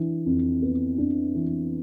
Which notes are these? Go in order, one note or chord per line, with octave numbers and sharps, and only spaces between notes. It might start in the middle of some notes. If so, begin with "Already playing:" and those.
Already playing: E3 D4
F2
B3
D4
E3